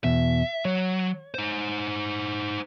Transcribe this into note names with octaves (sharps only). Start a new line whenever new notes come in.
E2 B2 E5
F#3 C#5
D#4 C5